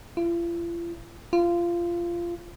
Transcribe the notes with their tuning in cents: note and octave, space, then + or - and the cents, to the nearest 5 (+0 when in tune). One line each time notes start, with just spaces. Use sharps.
F4 -45
F4 -20